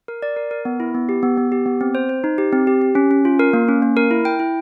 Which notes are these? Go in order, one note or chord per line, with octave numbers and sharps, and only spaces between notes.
A#4
D5
A#4
A#4
B3
E4
B3
G4
B3
B3
G4
B3
C4
C5
C5
D#4
G4
C4
G4
G4
C#4
C#4
F4
A#4
A#3
C#4
A#3
A#4
E4
G5
E4